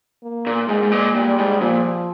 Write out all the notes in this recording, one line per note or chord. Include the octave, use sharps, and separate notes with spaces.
A#3
A#2
G#2 G#3
G#2
A#2
A#2 G3
G#2
A#2 F3